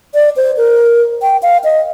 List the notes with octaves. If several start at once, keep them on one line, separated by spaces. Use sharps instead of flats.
D5
C5
A#4
G5
F5
D#5